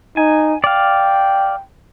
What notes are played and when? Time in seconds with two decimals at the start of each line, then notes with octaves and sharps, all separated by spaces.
0.17 D#4 G#5
0.64 D5 F5 G5